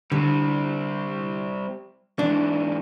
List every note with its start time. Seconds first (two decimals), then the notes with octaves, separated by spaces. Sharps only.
0.12 D3 G3 C4
2.19 G#2 E3 D4